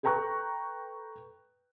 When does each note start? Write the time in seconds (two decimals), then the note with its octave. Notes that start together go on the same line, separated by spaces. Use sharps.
0.03 A4 B4 G5 A#5 C#6 F#6